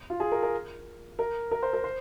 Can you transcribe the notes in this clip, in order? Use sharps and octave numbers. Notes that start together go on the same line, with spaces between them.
F4
G#4
A#4
A#4
A#4
A#4
C5
A#4
C5